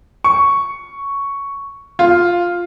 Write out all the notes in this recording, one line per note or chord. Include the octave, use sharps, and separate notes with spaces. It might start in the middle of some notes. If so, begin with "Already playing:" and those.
C#6
F4